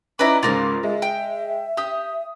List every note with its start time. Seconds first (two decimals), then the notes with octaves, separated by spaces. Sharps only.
0.19 C#4 D#4 E4 B4 D5 A#5 D6
0.43 C#2 G#2 C#3 F4 A#4 D5
0.83 G#3 E5
1.02 G5
1.77 G4 D#6